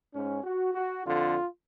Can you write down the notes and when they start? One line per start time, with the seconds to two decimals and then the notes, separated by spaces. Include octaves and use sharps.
0.14 G#2 C#4
0.44 F#4
0.74 F#4
1.04 F2 D3 F4